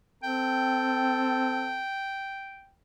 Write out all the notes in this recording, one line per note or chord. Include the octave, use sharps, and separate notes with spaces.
C4 A4 G5